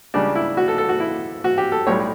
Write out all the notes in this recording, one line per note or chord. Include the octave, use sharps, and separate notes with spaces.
C#2 C#3 G3 D4
E4
F#4
A4
A4
F#4
E4
F#4
G4
A4
B1 A2 G3 C#5